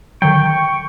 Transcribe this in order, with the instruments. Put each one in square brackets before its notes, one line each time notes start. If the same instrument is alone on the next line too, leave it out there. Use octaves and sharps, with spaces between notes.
[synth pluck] D3 D#3 F#3 [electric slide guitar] G5 [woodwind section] C#6